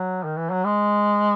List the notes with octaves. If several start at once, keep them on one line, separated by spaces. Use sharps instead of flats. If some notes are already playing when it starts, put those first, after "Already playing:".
Already playing: F#3
D#3
E3
F#3
G#3